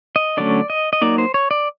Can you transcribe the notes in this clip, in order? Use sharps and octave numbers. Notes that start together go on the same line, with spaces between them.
D#5
D3 F#3 A3 C#4 D5
D#5
D#5
F#3 A#3 D#4 D5
C5
C#5
D5